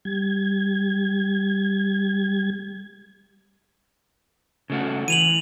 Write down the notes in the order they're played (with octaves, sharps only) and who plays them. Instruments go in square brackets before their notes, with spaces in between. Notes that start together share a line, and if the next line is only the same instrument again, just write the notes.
[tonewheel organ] G3 G#6
[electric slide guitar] C#3 A3 F#4
[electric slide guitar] E3 [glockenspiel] D#7 F7 F#7